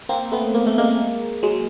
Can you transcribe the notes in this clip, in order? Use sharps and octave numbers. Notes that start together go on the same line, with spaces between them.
A#3 C4
A3 B3
A#3
A3
G#3 A#3
F#3 G#3